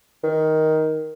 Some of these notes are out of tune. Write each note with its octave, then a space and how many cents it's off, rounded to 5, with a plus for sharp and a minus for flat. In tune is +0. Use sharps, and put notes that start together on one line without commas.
D#3 +10